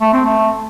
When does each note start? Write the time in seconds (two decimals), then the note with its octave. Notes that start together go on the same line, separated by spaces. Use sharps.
0.01 A3
0.13 C4
0.25 A3